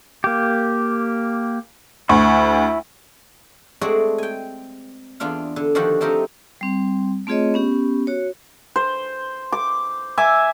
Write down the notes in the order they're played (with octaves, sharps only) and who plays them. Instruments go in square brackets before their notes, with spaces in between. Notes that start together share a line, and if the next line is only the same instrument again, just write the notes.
[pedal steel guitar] A#3 G4
[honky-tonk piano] D2 [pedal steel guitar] E4 B5 C#6
[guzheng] G#3 A3 C4 F#4 G#4 D5
G5 G#5
E2 B3 D4 F4 F5
D3
D3 D#3 F3 F#4 G4 F#5
F3 A3 C4 D#4 G4 A#4
[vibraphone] G3 C4
A3 C4 F4 G#4 C#5 D#5
B3 C#4 G4
F#4 C#5
[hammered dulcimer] C5
D6
E5 G#5 D6